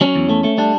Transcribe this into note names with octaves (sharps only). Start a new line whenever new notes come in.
F#3 C#4
E2
A3
A3
G3 D4